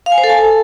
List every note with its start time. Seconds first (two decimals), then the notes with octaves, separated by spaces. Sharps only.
0.06 F5
0.12 G#5
0.18 C5
0.24 A4
0.29 A5